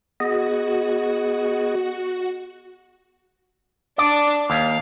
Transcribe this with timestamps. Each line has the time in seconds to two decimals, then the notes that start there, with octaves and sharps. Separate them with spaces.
0.20 B3 F#4 G#4 D#5
3.98 D4 D5
4.50 D#2 F5